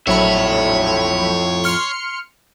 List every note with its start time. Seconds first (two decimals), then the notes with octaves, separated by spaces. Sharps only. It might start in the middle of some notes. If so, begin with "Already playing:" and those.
0.07 A#1 F2 A2 F#3 C#5 E5 B5
1.64 C6 F6 C#7